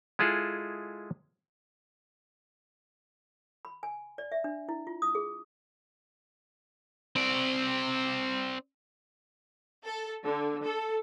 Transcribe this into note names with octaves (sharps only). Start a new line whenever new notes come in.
G#3 E4 F4 G#4 A4
B5
G#5
D5
E5
D4
E4
F4
D#6
G#4
C4 D5
A4
D3
A4